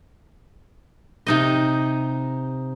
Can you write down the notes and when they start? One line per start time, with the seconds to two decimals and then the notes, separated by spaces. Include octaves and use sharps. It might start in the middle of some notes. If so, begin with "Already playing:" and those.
1.27 C3 D#4 D#5